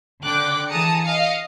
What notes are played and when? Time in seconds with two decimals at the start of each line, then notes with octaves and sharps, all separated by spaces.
0.23 D3 G5 D6 F#6
0.69 E3 G#4 A5 A#5 D#6 C#7
1.02 D#5 F5 C#7